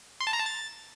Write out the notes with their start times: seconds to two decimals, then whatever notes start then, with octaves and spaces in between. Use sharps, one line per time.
0.21 C6
0.27 A5
0.33 A#5
0.40 A5
0.46 A6